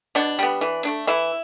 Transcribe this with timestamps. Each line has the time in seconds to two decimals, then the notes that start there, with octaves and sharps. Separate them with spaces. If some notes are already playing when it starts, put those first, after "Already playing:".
0.15 B2 D4
0.39 G3 B3
0.61 E3
0.85 A3 D4
1.07 E3 E4